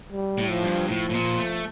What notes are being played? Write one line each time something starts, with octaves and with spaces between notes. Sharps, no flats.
G3
A2
F3
G2
A2 F3
A2
A#2
A3